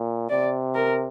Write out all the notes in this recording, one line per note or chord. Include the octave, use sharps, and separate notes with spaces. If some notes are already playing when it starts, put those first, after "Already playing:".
Already playing: A#2
C3 D5
A#4